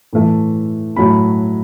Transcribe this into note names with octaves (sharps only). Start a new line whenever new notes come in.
A2 E3 A3
A2 F#3 A3 B5